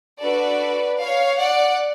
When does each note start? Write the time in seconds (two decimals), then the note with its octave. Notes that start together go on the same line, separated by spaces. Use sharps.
0.21 D4 F#4 A4 B4 D5
1.00 C#5 F5
1.39 D5 F#5